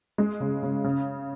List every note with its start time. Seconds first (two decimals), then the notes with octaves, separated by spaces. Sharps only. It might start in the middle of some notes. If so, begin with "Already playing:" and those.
0.18 G#3
0.40 C#3
0.63 C#3
0.84 C#3